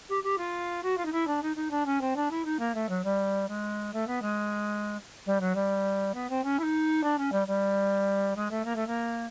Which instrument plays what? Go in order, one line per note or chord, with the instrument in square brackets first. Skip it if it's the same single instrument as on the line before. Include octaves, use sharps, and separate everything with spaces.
[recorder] G4
G4
F4
F#4
F4
D#4
E4
D4
D#4
D#4
D4
C#4
C4
D4
E4
D#4
A#3
A3
F#3
G3
G#3
A3
B3
G#3
G3
F#3
G3
B3
C4
C#4
E4
D#4
D4
C#4
G3
G3
G#3
A3
A#3
A3
A#3